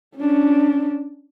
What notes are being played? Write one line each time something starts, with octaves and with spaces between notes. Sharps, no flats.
C#4 D4